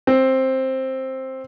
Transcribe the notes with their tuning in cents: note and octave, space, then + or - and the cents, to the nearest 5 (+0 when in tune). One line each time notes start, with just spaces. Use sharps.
C4 +10